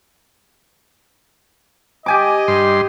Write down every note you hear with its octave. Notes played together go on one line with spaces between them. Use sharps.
G4 D#5 G#5 D6
G2 C6